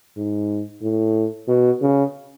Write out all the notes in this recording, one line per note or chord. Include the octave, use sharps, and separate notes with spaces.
G#2
A2
B2
C#3